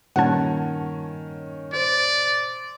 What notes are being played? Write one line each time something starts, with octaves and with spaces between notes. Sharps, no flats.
G2 A#2 D#3 C#4 F#5 A5 G#6
C5 D5